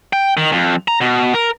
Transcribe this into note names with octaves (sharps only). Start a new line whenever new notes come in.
G5
D#3
F2
A#5
B2
A#4